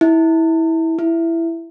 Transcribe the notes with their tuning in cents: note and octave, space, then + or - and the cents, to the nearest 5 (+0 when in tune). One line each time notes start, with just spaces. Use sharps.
E4 -20
E4 +10